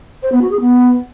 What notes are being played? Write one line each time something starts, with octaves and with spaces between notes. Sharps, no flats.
C5
B3
F#4
G#4
B3